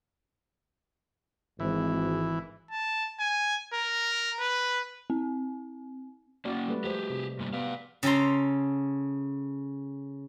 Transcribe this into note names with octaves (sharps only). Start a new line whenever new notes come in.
G#1 E3
A5
G#5
A#4
B4
C4
A#3 C#4 F#4 D5
G3 A3 B4
F3 G#3 G4 G#4 C5
C3
G2 A#2 G3
B3 D5 F5
C#3 C#4 A4 A#5 C6